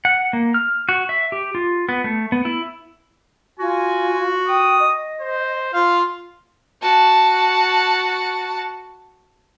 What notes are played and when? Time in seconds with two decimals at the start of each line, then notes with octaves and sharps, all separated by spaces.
0.05 F#5
0.33 A#3
0.54 F6
0.89 F#4
1.09 E5
1.32 G4
1.55 F4
1.89 B3
2.04 A3
2.32 B3
2.45 E4
3.59 F4 F#4 G#5
4.48 G5 D#6
4.79 D#5
5.20 C5
5.74 F4 F5
6.82 F#4 A5